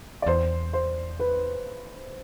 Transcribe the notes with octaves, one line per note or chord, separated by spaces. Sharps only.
D5
E2 C5
C5
B4